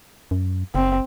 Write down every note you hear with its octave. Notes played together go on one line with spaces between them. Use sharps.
F#2
F#1 C4